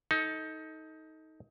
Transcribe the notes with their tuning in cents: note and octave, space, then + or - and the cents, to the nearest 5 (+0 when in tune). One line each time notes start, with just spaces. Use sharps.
D#4 +20 A4 +0